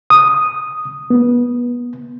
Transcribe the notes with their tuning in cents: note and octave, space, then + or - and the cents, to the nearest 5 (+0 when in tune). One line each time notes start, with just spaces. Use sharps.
D#6 -5
B3 -25